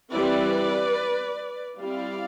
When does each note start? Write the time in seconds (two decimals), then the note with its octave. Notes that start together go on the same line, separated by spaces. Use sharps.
0.11 E3 G3 C4 E4 B4 D5
1.79 G3 C4 E4 D5 F5